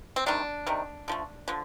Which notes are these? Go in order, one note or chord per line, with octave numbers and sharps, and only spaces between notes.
C4
C3 D#3 G3 D4
C3 D#3 G3
D3 F3 A3
D3 F3